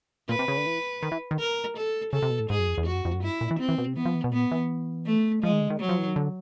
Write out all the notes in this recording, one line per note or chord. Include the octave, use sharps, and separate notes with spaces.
A#2 B4
C3
C#3
D3
E3
D#3
E3
D#3
A#4
A4
C#3 A4
C3
B2
A2
G#2 G#4
F#2
F2
E2
F2 F#4
F#2
F2
F#2
G2 E4
A#2
E3
C4
E3
B2
C3
E3 B3
F3
E3
B2
A#2 B3
E3
A3
F3 G#3
D#3
D3
D#3
F#3
F3
E3
D#3
D3